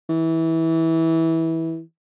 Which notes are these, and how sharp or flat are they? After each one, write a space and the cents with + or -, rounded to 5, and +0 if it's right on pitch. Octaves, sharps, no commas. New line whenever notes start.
E3 -20